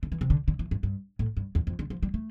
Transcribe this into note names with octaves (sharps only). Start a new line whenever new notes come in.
D3
E3
C3
D3
D3
E3
G2
G2
A2
G2
E2
F2
D3
F3
G3
A3